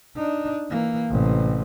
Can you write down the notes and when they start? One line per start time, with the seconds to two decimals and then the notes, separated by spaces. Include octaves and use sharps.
0.16 D4 D#4
0.70 E3 A#3
1.10 A1 C3